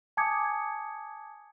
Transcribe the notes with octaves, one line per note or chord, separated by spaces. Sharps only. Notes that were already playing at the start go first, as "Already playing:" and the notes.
G#5 A5 D6 D#6 G#6 C#7